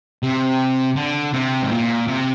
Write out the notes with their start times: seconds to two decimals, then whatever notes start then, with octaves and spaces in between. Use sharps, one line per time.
0.23 C3
0.96 D3
1.33 C3
1.63 G#2
1.71 A#2
2.08 C3